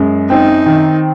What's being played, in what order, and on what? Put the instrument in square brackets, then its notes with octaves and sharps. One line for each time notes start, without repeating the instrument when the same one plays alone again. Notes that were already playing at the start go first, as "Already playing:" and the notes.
Already playing: [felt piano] F#2 G#3
[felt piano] C4 [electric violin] D#4
[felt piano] D#3